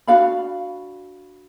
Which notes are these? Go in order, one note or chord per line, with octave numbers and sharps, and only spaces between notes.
D4 F#4 F5 B5